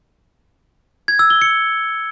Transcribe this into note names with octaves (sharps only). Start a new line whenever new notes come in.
G#6
E6
G7
C#7